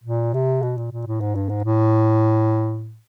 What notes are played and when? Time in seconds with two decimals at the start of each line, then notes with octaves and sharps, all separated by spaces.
0.04 A#2
0.34 C3
0.62 B2
0.77 A#2
0.92 A#2
1.06 A2
1.21 G#2
1.35 G2
1.49 G#2
1.64 A2